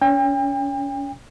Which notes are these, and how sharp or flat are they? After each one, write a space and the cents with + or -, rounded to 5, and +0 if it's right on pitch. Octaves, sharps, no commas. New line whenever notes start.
C#4 +30 G5 +40